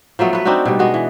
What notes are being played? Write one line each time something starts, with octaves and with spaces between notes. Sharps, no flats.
F3 F#3 A3 B3
B3 B4
C4 D4 D#4 F#4
B2 G3
G#3 B3 F#4
E3